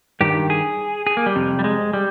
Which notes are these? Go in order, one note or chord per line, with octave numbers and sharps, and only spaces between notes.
G2 D#3 G4
G#4
G#4
A#3
G3
F2 C3
G3
G#3
G3